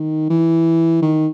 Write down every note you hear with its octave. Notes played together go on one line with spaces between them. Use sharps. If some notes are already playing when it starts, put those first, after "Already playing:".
Already playing: D#3
E3
D#3